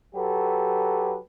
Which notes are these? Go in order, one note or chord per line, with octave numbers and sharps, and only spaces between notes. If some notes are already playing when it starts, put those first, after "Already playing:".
F#3 G4 A4 B4